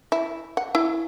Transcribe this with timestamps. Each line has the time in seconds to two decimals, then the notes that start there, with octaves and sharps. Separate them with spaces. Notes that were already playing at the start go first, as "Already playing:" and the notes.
0.12 E4
0.57 F#5
0.75 E4